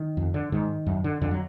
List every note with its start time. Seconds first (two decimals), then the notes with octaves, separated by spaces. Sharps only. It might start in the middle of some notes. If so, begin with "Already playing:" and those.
Already playing: D#3
0.17 F2
0.34 D3
0.52 G#2 D#3
0.86 F#2
1.04 D3
1.21 F2 D3
1.31 F#3